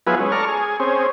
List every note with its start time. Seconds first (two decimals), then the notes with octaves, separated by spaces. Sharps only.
0.07 F#3 B3 E4 F4 G#4 B4
0.20 G#3 C#4
0.32 A4 D5 A#5 C#6 F6
0.49 G#4
0.80 C4 C#4 G#4